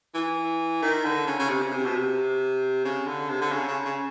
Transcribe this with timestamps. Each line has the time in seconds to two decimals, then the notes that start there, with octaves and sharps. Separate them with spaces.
0.15 E3
0.82 D#3
1.05 D3
1.27 C#3
1.39 C#3
1.49 C3
1.62 C#3
1.72 C3
1.85 B2
1.95 C3
2.85 C#3
3.07 D3
3.29 C3
3.41 D3
3.52 C#3
3.68 C#3
3.85 C#3